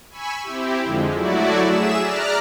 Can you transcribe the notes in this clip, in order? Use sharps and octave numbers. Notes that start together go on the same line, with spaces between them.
G#5 B5 C#6 E6
C4 E4 G4
F2 D3 F3 G#3
F#3 A3 E4 F#4 D5
G#4 E5 E7
D5 A#5 F6 F#6